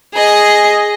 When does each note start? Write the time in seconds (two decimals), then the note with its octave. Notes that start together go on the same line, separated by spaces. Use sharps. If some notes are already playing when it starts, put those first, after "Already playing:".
0.13 G#4 D#5